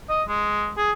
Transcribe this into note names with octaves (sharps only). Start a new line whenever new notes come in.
D#5
G#3
G#4